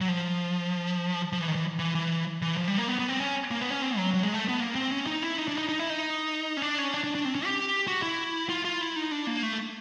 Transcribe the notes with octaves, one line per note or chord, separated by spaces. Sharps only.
F#3
F3
F3
E3
D#3
E3
E3
E3
E3
F3
G3
A#3
B3
B3
C4
C#4
A#3
B3
C#4
C4
F#3
F#3
G#3
A3
B3
A#3
C4
C#4
D#4
E4
D#4
D4
D#4
D#4
E4
D#4
C#4
D4
C#4
D4
D4
D4
C4
C#4
G4
F#4
E4
F4
F4
E4
D#4
D4
A#3
A3